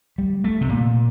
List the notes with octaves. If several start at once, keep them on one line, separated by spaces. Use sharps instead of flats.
G3
A3
C3
A#2